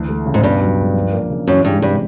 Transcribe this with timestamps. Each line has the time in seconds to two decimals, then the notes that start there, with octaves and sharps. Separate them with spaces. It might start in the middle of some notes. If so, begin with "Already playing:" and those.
Already playing: D2 E3
0.09 A3
0.26 C#3
0.34 G#2
0.43 G2 B2
0.61 F#3
0.79 C#2
0.96 F3
1.12 A#3
1.30 C#3
1.47 F#2 E3
1.65 G2 G#3
1.82 G2 C3